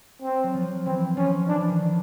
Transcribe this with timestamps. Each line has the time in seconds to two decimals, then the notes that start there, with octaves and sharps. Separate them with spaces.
0.22 C4
0.43 F#3
0.54 F3
0.86 E3 C4
1.17 F3 C#4
1.49 E3 D4
1.69 D#3